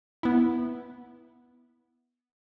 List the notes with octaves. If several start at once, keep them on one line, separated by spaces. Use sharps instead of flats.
B3 E4